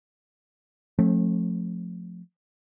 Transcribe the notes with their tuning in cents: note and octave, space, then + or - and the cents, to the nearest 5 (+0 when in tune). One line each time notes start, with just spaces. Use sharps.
F3 +30 A3 +0 C#4 -45